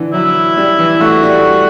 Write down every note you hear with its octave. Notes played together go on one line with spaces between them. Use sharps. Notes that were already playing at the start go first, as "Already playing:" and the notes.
Already playing: D3 E3
F#3 E4
G3
E3
A3 F#4
G3